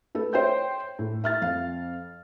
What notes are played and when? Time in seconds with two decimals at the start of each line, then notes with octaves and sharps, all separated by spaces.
0.15 A3 A4 B4
0.33 C5 C#5 E5 G5 G6
0.99 A2
1.24 E5 F6 A6
1.42 F2 F5